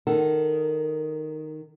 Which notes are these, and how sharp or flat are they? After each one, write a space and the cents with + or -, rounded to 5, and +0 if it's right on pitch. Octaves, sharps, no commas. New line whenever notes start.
D#3 -5 A4 +0 F#5 +35